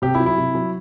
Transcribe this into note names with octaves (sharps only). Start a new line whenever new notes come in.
C3 G4
E4
F#3
E4
C3
F#3